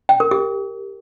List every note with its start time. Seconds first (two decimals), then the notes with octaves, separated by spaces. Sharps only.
0.09 G5
0.20 A#4
0.31 G4